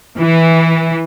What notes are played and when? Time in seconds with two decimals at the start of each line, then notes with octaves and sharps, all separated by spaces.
0.19 E3